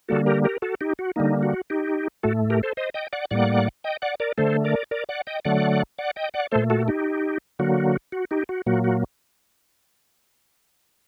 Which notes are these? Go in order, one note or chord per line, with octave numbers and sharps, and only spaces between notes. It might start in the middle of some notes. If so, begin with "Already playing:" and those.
D3 G3 A#3 F#4 A4
G4 A#4
G4 A#4
F#4 A4
D#4 G4
F#4
D3 G3 A#3 D#4
F#4
D#4 G4
A2 A3 F#4 A4
G4 A#4
A4 C5
C5 D#5
D#5 G5
D5 F#5
A2 G3 A#3 D5 F#5
D#5 G5
D5 F#5
A#4 D5
D3 A3 A4 C5
A#4 D5
A#4 D5
D5 F#5
D#5 G5
D3 F#3 A3 D5 F#5
D5 F#5
D#5 G5
D5 F#5
A#2 A3 A4 C5
F#4 A4
D#4 G4
D3 F#3 A#3 F#4
F#4
D#4 G4
F#4
A#2 F#3 A#3 F#4
F#4